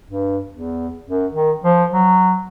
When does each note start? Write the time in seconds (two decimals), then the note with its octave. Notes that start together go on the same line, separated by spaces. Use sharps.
0.07 G2
0.51 E2
1.08 F#2
1.33 D#3
1.64 F3
1.92 F#3